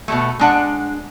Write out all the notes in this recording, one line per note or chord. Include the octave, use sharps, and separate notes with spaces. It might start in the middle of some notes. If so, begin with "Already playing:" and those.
B2 G#3 A3
G#3 D4 F#5